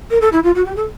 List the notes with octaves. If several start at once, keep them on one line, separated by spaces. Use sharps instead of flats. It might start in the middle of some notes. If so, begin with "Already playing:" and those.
A#4
A4
E4
F4
F#4
G4
A4